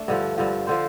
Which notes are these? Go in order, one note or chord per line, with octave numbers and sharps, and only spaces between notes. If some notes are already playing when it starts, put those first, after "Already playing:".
Already playing: A3 D4
G2 D3 F3
G2 D3 F3
D3 F3 C5